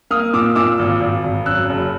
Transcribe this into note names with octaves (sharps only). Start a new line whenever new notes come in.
A#3 D#6 F6
A#2 D6 E6
A#2 D6 E6
G#1
G#1
G#1
F#2 E6 F#6
F#1